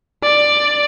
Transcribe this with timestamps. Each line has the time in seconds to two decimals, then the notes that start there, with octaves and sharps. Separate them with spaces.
0.23 D5